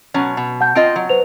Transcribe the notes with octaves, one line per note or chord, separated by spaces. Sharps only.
B2 F#3 C#4
B2
F#5 A5 G6
C4 F4 D#5 D7
F#3
B4 C5 F7